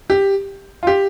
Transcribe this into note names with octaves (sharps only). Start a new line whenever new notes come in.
G4
F4
G4